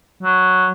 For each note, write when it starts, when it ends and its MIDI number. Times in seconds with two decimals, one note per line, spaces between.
0.23 0.71 54